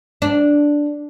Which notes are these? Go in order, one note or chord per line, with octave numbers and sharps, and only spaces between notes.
D4